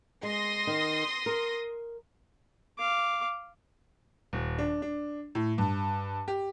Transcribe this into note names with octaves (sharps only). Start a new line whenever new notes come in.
G#3 C6 D#6 A#6
D#3
A#4
F5 D6
D#1
D4
D4
A2
G2
G4